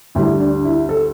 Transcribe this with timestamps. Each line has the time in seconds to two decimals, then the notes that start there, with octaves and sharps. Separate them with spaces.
0.15 D2 D3 G3 E4
0.40 D4
0.65 E4
0.89 A4